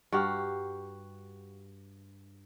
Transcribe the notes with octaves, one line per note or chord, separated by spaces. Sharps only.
G2 F#4 G4 F5